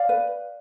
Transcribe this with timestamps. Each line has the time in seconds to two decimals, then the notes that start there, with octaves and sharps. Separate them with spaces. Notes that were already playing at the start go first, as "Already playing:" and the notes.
Already playing: D5 F5
0.09 B4